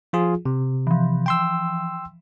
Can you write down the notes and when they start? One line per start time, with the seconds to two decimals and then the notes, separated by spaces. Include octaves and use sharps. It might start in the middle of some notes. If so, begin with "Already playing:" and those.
0.13 F3 F4 G#4
0.46 C3
0.87 E3 F3
1.26 G5 C6 E6